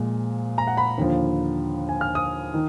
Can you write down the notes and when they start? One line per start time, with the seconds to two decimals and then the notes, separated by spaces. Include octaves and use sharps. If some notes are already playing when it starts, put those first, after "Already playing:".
Already playing: A#2 F3 G#3
0.58 A#5
0.67 F#5
0.77 B5
0.98 D#2 D3 F3
1.89 G#5
2.01 F6
2.15 D#6
2.54 D#3